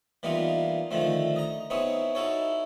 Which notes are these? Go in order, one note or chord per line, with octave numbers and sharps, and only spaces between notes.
E3 G3 A#3 B3 D#4 F4
D3 D#3 F3 A3 C4
D#5 A#5
B3 C4 D#4 E4 G#4 C#5
D#4 E4 F#4 A4 C#5